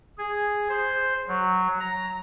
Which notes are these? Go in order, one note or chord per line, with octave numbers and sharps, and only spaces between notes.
G#4
C5
F#3
A#5